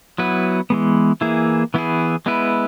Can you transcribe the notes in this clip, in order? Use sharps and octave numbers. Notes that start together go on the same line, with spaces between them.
F#3 B3 E4 B4
E3 G#3 B3
E3 A#3 E4 G#4
E3 B3 E4 G#4
G#3 B3 E4 B4